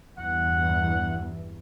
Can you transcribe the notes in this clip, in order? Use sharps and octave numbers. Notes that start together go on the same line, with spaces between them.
E2 G2 E3 F#5